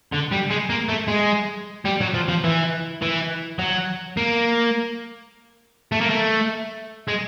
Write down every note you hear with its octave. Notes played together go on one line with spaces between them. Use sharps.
D3
G3
G#3
A#3
A3
G#3
G3
F#3
F3
F3
E3
E3
F#3
A#3
A3
A#3
A3
G#3